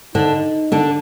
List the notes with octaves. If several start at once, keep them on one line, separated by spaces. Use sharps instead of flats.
D3 D4 D#4
D3 D4